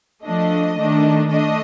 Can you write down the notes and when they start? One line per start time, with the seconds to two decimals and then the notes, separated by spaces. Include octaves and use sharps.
0.24 F3 A3 D4 D#5
0.78 D#3 A3 D4
1.30 A3 D4 D#5